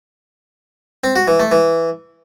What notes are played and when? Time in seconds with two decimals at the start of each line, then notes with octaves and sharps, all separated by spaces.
1.04 C4
1.16 F#4
1.28 E3
1.40 A3
1.51 E3